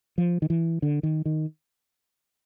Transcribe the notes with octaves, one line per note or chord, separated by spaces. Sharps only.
F3
D#3
E3
D3
D#3
D#3